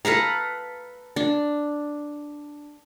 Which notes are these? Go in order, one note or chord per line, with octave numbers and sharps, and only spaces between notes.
A4 B4 F5 A#5
D4